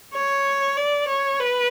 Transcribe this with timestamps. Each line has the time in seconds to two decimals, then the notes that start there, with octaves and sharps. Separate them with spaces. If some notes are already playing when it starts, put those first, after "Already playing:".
0.15 C#5
0.77 D5
1.08 C#5
1.39 B4